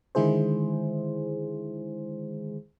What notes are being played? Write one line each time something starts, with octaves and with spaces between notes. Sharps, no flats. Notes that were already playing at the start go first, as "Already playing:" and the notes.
D3 D#3 G#3 E4 G#4 C5